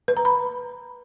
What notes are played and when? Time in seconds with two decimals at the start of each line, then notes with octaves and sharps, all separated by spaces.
0.08 B4
0.17 A#5
0.25 B5